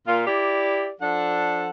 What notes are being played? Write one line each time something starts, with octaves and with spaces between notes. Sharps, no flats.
A#2 F4
E4 G4 D5
F3 D4 A4 F#5